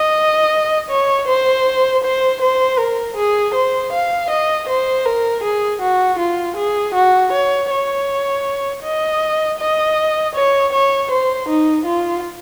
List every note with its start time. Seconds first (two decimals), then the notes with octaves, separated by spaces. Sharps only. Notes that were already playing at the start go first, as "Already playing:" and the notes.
Already playing: D#5
0.90 C#5
1.27 C5
2.03 C5
2.41 C5
2.78 A#4
3.16 G#4
3.54 C5
3.92 F5
4.30 D#5
4.68 C5
5.06 A#4
5.43 G#4
5.81 F#4
6.19 F4
6.57 G#4
6.94 F#4
7.32 C#5
7.71 C#5
8.84 D#5
9.59 D#5
10.35 C#5
10.73 C#5
11.10 C5
11.48 D#4
11.86 F4